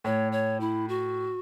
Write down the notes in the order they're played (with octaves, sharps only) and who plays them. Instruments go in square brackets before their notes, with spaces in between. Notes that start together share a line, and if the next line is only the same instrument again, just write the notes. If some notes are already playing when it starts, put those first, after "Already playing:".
[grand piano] A2 [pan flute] C#5
[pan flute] C#5
E4
F#4